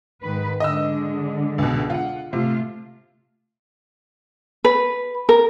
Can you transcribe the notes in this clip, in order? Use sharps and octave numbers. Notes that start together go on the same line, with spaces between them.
G#2 D#3 B4
D3 G#3 D#5 E6
C#2 B2
F4 F#5
C3 A3 F4
B4
A#4